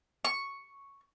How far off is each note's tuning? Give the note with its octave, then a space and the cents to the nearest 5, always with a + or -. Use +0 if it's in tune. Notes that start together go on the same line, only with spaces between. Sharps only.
C#6 +0